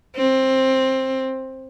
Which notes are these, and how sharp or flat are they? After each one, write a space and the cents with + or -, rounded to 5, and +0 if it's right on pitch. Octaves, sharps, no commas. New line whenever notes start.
C4 +15